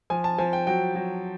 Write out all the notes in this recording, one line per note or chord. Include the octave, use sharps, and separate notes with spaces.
F3 G#5
A5
F3 G#5
G5
F#3 G5
F#3